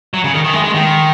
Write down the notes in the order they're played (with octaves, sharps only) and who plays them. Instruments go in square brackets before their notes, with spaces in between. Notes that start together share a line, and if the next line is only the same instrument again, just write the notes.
[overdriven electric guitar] F#3
C#3
D#3
D#3
G#3
G#3
D#3